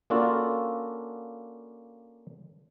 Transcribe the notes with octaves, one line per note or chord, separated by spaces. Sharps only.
A#3 C#4 D4 F4 F#4 A4